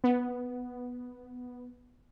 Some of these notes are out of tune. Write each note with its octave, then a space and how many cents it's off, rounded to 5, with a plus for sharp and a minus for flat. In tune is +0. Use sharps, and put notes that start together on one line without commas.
B3 +0